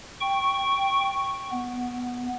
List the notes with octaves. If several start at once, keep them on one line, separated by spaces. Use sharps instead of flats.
G5 C#6
B3